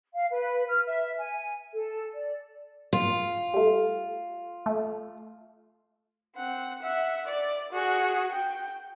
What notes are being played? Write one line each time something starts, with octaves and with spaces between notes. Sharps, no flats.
F5
B4
F6
E5
G#5
A4
D5
F4
G3 A3
A3
C4 F#5
E5 F#5
D5
F#4 G#4
G5